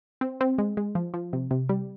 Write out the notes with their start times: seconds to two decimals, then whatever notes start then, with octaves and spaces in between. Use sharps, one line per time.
0.21 C4
0.41 C4
0.58 G#3
0.77 G#3
0.95 F3
1.14 F3
1.33 C3
1.51 C3
1.69 G3